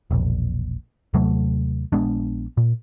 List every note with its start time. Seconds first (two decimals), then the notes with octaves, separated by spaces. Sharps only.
0.11 E1 A#1
1.14 D#2 C3 F#3 A3
1.92 A#1 G#3 B3 D4
2.57 A#2